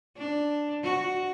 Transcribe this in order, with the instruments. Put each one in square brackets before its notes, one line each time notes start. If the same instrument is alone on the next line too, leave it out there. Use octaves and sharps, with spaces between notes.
[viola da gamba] D4
F#4